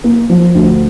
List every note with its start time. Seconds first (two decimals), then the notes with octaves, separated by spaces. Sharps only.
0.04 A#3
0.30 F3
0.55 D2